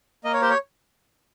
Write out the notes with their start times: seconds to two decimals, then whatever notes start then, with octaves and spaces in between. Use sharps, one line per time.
0.24 A#3 D#5
0.33 C#5
0.41 G4 C5
0.50 C#5